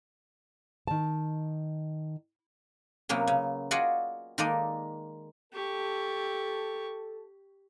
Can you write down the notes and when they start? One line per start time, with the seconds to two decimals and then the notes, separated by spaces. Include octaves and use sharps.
0.87 D#3 A5
3.09 C3 F#3 A#3 B3 C#4
3.27 C#3
3.71 F4 F#4 G#4 D5 D#5 F#5
4.38 D#3 G#3 A#3 A4 D5 D#5
5.53 G4 A4 C#6